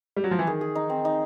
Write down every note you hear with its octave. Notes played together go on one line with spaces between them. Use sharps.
G3
F#3
F3
E3
D#3 G#4
G#4
D#4
C4
D#4